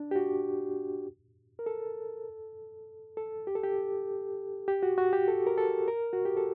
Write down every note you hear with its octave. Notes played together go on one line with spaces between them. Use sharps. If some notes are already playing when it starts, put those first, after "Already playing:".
Already playing: D4
G4
F#4
A#4
A4
A4
G4
A4
G4
G4
F#4
F#4
G4
A4
A#4
A4
A#4
F#4
G4
A4